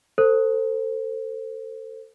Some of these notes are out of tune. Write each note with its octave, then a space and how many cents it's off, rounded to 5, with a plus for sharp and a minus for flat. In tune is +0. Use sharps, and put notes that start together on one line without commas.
A4 +30 C5 +0